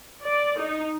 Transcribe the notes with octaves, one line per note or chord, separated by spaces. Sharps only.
D5
D#4